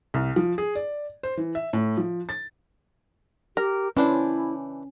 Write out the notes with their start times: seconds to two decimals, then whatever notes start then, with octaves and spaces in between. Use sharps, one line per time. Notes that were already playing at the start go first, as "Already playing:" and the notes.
0.14 C2
0.36 F3
0.58 G#4
0.75 D5
1.23 C5
1.37 E3
1.55 E5
1.73 A2
1.98 F3
2.29 A6
3.57 G4 A#4
3.97 E3 C#4 D4 E4 C5